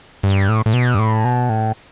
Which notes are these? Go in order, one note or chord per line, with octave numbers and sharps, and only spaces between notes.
G2
A2
A2
B2
G2
A2
B2
A2